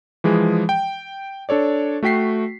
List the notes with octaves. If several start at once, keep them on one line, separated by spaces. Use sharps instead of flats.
E3 F3 G#3 G#4
G5
D4 A4 C#5 D5
A3 F#4 G5 B6 C7